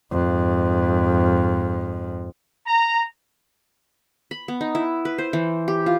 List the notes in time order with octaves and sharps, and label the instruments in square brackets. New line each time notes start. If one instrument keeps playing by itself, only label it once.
[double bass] F2 G#2
[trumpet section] A#5
[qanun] B5
B3
D#4
E4
B4
C5
E3
G4
F4